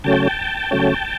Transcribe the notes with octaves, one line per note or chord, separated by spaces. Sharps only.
C#3 F#3 A3 C#4 G5 A5
C#3 F#3 A3 C#4